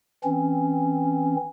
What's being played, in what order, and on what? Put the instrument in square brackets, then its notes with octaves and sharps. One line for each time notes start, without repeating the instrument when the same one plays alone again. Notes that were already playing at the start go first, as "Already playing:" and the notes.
[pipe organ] E3 C4 C#4